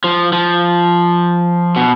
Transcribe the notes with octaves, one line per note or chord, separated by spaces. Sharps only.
F3
F3
B2